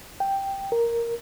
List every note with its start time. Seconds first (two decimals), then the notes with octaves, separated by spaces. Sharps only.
0.20 G5
0.72 A#4